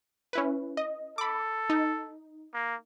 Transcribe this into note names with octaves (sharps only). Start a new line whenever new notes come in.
C#4 E4 B4
D#5
A4 B5 D6
D#4
A#3